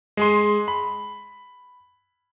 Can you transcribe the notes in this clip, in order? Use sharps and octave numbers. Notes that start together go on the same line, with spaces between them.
G#3 G#4 C6
B5